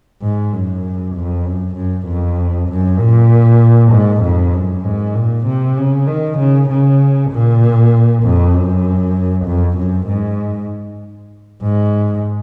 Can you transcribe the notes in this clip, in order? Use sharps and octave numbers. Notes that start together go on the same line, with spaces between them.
G#2
F#2
F2
F#2
F#2
F2
F#2
A#2
G#2
F2
F#2
G#2
A#2
C3
C#3
D#3
C#3
C#3
A#2
F2
F#2
F2
F#2
G#2
G#2